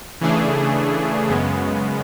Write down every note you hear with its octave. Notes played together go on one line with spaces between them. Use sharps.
C#3 E3 A3 D4 G#4
F#2 C#3 G#3 B3